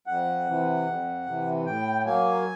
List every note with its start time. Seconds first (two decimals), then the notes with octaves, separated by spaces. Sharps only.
0.07 F2 F#5
0.47 C3 E3
0.86 F2
1.26 C3 E3
1.66 A2 G5
2.05 F#3 A#3 G#5